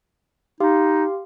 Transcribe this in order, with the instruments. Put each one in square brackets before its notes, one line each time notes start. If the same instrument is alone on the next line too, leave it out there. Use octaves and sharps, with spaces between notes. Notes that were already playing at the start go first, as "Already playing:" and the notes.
[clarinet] D#4 [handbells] G4 F5 C6